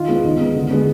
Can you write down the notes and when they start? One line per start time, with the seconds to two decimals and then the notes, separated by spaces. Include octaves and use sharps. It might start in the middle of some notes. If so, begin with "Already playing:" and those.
Already playing: D#3 F4
0.08 G#3 B3
0.24 D#3
0.40 G#3 B3
0.56 D3
0.71 G#3 B3